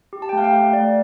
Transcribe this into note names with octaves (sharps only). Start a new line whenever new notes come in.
G4
A5
G5
A3 F5
G5
A3 F5
A3 D5